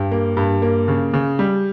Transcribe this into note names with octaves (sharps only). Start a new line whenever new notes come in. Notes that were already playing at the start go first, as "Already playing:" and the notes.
Already playing: G2
A#3
G2
A#3
C#3
C#3
G3